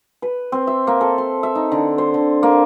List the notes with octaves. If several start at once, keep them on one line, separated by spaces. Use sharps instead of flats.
B4
C4
E5
A#3
A4
C6
E5
D#4
D3
C5
D3
A#3